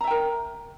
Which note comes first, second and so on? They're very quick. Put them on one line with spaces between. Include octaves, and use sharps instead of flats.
A#5 E5 G5 A#4